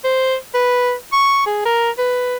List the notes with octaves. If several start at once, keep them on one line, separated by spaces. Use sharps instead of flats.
C5
B4
C#6
G#4
A#4
B4